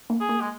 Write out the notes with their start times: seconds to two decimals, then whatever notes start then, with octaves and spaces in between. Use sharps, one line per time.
0.10 A#3
0.20 G#4
0.29 A#3
0.41 G#3